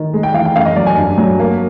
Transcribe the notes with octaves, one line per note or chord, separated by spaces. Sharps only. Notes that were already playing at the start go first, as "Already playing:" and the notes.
Already playing: D#3
G#3
G5
E3 F5
G5
F#2 F5
D#5
F#3 D5
G#5
G2
F#3
A#3